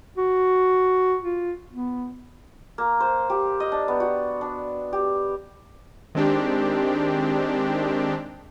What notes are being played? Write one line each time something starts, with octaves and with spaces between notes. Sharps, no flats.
F#4
F4
B3
A#3
C5
G4
D#5
D4
B3
F#4
D4
G4
D#3 G#3 C4 D4 G4